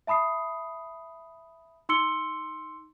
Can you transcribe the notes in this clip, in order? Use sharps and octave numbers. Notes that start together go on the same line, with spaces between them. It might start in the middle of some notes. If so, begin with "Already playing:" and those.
E5 A5 B5 D#6 C7
D#4 C6 E6 C#7 G7